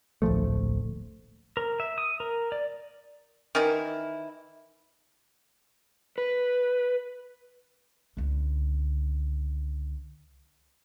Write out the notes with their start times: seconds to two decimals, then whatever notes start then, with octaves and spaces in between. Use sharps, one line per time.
0.22 D1 A#1 F3 A3
1.57 A#4
1.80 E5
1.98 D#6
2.20 A#4
2.52 D5
3.55 D#3 E3 E4
6.18 B4
8.17 C#2 D3